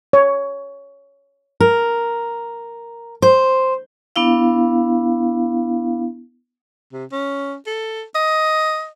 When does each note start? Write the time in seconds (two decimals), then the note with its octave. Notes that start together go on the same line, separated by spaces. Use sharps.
0.13 C#5
1.60 A#4
3.22 C5
4.16 B3 D4 E4 F5
6.93 C3
7.12 C#4
7.67 A4
8.15 D#5